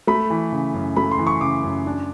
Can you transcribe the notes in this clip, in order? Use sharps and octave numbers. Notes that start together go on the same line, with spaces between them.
A3 B5
E3
C#3
F#2
A3 B5
C6
E3
C#6
C#3 D6
F#2
D4